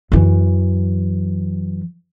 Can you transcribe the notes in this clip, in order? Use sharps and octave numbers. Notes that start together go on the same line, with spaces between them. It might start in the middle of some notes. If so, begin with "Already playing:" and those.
F#2 E3